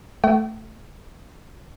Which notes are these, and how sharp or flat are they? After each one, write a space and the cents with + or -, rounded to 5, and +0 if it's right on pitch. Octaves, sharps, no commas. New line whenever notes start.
A3 +0 G5 -45